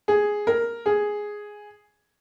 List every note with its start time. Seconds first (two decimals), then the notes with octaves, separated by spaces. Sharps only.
0.08 G#4
0.47 A#4
0.86 G#4